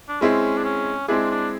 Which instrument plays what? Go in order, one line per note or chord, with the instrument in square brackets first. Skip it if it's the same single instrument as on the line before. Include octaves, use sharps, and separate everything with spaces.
[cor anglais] D4
[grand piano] G#3 C4 E4 G#4 [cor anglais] C#4
[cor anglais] D4
C#4
[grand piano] G#3 C4 E4 G#4 [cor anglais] D4
[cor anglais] D4